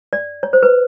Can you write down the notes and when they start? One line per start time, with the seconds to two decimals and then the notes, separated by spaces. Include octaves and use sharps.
0.13 D5
0.43 C#5
0.53 C5
0.63 B4